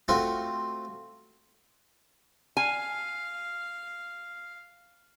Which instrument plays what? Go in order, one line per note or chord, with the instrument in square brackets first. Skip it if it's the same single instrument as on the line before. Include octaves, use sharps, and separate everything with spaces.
[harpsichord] A3 C4 F4 F#4
[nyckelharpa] F5 [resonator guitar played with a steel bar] G#5